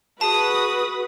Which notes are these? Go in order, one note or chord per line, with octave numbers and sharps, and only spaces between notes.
F#4 G#4 B4 A5 D#6